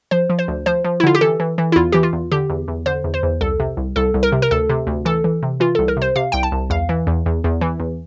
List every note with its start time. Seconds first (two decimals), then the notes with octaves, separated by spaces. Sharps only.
0.11 F3 C5
0.30 F3
0.39 C5
0.48 D2
0.66 F3 C5
0.84 F3
1.00 E4
1.04 D3 F4
1.15 G4
1.21 E3 A4
1.40 E3
1.58 E3
1.72 E4
1.76 E2 F4
1.92 E3 G4
2.03 F4
2.13 E2
2.32 D3 G4
2.50 E2
2.68 E2
2.86 D3 C5
3.04 E2
3.14 C5
3.23 E2
3.41 C2 A4
3.60 C3
3.77 C2
3.96 C2 A4
4.14 C2
4.23 A#4
4.32 C3
4.42 A#4
4.51 D2 A4
4.69 C3
4.87 D2
5.05 E3 A4
5.24 E3
5.43 C3
5.60 E3 F4
5.75 C2 A4
5.88 A#4
5.97 C3 C5
6.16 C3 F5
6.32 C2 G5
6.43 A5
6.52 C2
6.70 E2 F5
6.89 E3
7.07 E2
7.26 E2
7.44 E2
7.61 E3
7.80 E2